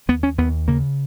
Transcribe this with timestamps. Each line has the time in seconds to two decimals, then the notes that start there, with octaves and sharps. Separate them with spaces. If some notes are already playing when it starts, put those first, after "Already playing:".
0.08 D#2 B3
0.23 C#4
0.38 D#2 B3
0.68 C#3 A#3